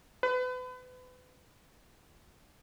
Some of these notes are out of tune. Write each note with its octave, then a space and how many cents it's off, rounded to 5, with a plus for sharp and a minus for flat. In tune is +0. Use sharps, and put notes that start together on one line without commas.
B4 +35